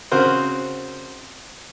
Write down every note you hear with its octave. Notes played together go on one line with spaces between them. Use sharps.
C#3 C4 F#4 A#4 C5